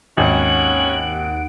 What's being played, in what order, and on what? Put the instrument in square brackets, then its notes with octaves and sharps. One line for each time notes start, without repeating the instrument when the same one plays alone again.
[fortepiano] G#1 [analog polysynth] D#2 F#5 D7 [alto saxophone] C#4 [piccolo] F#7